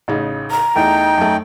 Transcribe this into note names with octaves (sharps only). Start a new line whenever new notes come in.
A1 C#3 D#4
A#5
E2 A3 D#4 G5
F#2 A3